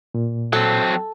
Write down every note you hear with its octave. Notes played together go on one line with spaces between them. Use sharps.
A#2
F#3 C4 A4